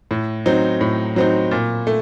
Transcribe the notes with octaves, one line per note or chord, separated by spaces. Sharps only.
A2
F#3 C4 D#4
A2
F#3 C4 D#4
A#2
A3